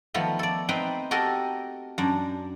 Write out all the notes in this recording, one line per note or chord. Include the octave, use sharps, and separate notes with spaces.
D#3 F3 A3 B3
A4 D5
C4 D#4 B4 G5
F#4 G4 A4 A#4 D#5
F#2 D4